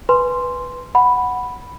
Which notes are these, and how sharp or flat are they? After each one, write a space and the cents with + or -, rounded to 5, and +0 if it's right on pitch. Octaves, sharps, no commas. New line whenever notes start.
B4 +0 G#5 +0 C6 +0
F#5 +0 B5 +0